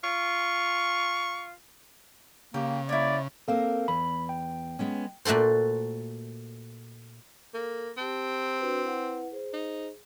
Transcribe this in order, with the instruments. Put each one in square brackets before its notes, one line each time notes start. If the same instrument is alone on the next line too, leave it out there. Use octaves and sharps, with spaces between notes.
[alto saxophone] F4 [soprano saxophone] C#6
[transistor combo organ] C#3 [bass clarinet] A#3 [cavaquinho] G4
[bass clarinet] A#3 [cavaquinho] E4 C#5 [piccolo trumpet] D5
[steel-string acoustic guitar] A#3 C4 A#4 [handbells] A4 F5
[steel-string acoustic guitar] E2 [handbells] B5
[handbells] G5
[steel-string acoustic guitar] G#3 B3 C#4
[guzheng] A#2 A3 F#4 A4 C5
[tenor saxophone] A#3 [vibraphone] A4
[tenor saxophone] C4 [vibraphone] G4 A5
[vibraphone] D4 F#4 B4
E4 B4 F#5
G#4 C5
[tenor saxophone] D#4